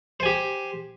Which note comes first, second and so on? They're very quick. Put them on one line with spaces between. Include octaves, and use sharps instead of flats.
C5 G#5 G4